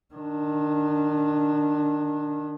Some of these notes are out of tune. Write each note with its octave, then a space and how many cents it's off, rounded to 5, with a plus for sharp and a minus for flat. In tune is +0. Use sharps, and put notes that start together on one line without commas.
D#3 -20 D4 +0